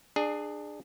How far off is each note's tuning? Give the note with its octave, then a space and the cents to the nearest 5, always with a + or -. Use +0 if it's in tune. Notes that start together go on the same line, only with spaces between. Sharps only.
D4 +25 G#4 +0